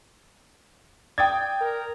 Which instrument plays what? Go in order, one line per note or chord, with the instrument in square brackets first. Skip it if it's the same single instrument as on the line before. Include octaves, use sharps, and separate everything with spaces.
[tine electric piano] D5 G#6 [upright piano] G5 D#6 A6
[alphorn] A#4